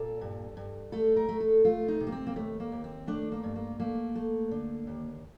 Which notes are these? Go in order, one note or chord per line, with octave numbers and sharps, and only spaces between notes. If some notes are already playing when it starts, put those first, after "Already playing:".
Already playing: A#2 A4
G2
G2
A3 A4
A#4
A3
A4
A3 F4
D#4
C3
A#3
C4
A#3
D#2 A3
A#3
D#2
C4
A3 D4
A#3
G2
A#3
A3 A#3
A3
D3
D#2